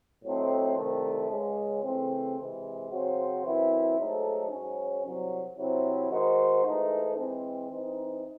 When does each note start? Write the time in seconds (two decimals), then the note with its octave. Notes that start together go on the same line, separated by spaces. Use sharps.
0.24 A2 F#3 A3 C4 D#4
0.77 C2 C3 D#3 A3
1.30 C#2 C#3 G#3
1.83 C#3 E3 A3 C4
2.37 C3 E3 G#3
2.91 C#3 F#3 C4 F#4 C5
3.44 F#2 E3 C4 E4
3.97 G#2 F#3 A3 D#4 A4
4.51 G#2 F#3 C#4
5.03 C2 C3 F#3
5.57 C3 F#3 C4 E4
6.10 D#3 G#3 D#4 F#4 C5
6.64 G#2 E3 A3 D#4 A4
7.18 E3 G#3 C4
7.70 E3 C4 D#4